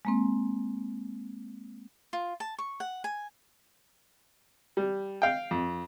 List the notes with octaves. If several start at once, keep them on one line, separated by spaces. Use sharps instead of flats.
G#3 A#3 C4
F4
A5
C#6
F#5
G#5
G3
F5 G5
F2